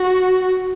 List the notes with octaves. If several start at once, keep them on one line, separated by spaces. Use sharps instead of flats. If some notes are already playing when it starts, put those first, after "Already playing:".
Already playing: F#4